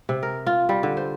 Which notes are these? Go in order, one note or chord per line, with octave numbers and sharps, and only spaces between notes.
C3
A#4
F4
G3
D3
C5